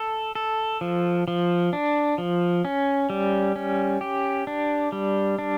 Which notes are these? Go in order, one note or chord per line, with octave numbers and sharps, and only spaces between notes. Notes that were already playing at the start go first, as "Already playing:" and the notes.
Already playing: A4
A4
F3
F3
D4
F3
C#4
G3
C#4
G4
D4
G3
D4